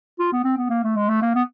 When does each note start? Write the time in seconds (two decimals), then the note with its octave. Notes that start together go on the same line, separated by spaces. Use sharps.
0.19 F4
0.32 B3
0.44 C4
0.58 B3
0.70 A#3
0.84 A3
0.96 G#3
1.09 A3
1.22 A#3
1.35 B3